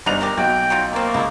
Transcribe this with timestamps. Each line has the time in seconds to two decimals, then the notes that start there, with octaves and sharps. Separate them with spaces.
0.06 G1 F3 D4 D#4 F7
0.21 G4 A4 A#4
0.38 B1 F#4 G5
0.70 F#3 D#4 F4
0.93 A3 A#3 C4
1.14 C#2 A3 E4